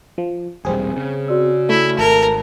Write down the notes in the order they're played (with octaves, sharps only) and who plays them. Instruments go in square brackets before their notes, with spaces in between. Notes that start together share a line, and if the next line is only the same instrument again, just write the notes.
[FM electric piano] F3
[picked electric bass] E1 A#1 G3 [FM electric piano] C4 G#4
[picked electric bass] C#3
[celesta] F#4 D5 E6
[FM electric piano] A3 [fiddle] E4
[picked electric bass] G#1 [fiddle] A#4 [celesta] A5